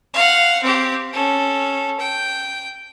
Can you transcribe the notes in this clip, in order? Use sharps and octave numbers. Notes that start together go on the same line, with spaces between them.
F5 F#5
C4 G4
C#4 A4
G5